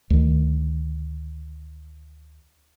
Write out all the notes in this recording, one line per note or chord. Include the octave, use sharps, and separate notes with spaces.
D2 D#3